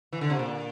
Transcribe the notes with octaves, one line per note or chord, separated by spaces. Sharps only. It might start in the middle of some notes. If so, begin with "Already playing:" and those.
E3
D3
C3
A#2